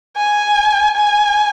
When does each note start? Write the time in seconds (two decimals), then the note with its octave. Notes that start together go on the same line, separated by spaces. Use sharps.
0.16 G#5
0.96 G#5